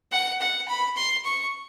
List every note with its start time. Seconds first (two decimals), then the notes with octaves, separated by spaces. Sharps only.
0.12 F#5
0.41 F#5
0.68 B5
0.97 C6
1.25 C#6